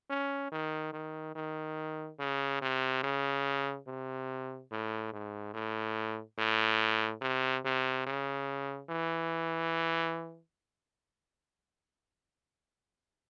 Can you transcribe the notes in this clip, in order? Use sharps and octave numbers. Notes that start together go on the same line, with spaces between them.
C#4
D#3
D#3
D#3
C#3
C3
C#3
C3
A2
G#2
A2
A2
C3
C3
C#3
E3